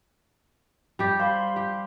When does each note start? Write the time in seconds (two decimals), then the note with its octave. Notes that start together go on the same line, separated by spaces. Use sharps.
0.99 G3 G4
1.20 C5 F5 B5 C6
1.56 G4